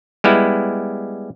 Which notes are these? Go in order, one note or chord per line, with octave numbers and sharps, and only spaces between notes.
G3 G#3 B3 E4